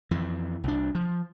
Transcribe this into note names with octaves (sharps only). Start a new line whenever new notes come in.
F2 E3
C2 D4
F3